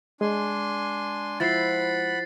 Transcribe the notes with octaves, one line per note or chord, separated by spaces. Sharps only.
G#3 D4 G#5 C6
F3 E4 C5 F#5 B5 A6 C7